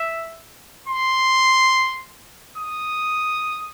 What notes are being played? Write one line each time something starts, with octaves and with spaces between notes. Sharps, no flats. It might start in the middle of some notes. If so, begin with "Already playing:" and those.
Already playing: E5
C6
D#6